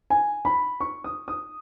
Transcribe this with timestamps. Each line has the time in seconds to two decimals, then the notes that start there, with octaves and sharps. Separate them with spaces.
0.10 G#5
0.45 B5
0.81 C#6
1.04 D#6
1.28 D#6